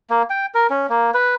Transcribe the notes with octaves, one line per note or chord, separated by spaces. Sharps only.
A#3
G5
A#4
C#4
A#3
B4